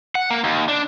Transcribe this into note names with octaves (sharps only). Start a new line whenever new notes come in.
F#5
A#3
D#2
D4